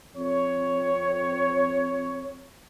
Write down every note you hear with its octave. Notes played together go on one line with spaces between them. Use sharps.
F2 C4 C#5